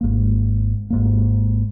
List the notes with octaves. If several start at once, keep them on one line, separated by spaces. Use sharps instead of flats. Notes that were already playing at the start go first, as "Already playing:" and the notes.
G#1 G#2 F3 A#3
G#1 G#2 F3 A#3